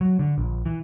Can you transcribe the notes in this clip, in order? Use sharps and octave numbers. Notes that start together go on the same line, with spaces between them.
F#3
D3
A#1
E3